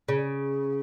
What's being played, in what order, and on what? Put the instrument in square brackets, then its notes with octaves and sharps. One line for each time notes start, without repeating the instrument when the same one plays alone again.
[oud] C#3